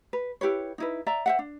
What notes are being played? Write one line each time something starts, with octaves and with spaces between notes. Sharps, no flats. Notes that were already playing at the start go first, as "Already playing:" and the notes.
B4
E4 G4 B4 C#5
D#4 E4 B4
D5 E5 A#5
C5 E5 F#5
D4